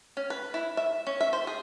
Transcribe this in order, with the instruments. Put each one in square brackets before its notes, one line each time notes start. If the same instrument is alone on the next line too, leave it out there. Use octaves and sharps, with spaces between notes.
[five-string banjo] C#4
B4
E4
E5
C#4
E5
C5
G#4